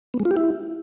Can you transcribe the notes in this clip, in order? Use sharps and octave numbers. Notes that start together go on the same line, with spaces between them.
B3
G#3
F4
G4
E4